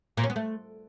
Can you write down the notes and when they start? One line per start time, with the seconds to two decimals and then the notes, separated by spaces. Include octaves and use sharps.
0.17 A#2
0.23 C#4
0.30 B3
0.36 A3